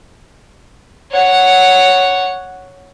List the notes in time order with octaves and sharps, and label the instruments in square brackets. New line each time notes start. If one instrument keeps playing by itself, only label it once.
[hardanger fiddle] C#5 F#5